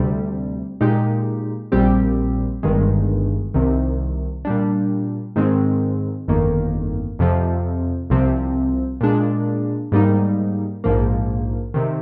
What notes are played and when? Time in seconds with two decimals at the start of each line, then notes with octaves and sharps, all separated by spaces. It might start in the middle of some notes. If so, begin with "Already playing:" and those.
Already playing: D2 C3 G3
0.81 A#2 G#3 D#4 G4
1.72 A#1 A#2 G3 C4 G4
2.63 G1 G2 D#3 G#3
3.54 C2 C3 D#3
4.45 A#2 G3 D4
5.36 G#2 D#3 G#3 C4
6.28 G1 F2 D#3 A#3
7.19 F2 C3 F3
8.10 C2 C3 F3 C4
9.01 A#2 G#3 D4
9.92 G#2 G3 A#3 D#4
10.84 A#1 G#2 F3 A#3
11.74 C3 D#3